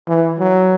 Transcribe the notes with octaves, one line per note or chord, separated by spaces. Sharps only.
E3
F#3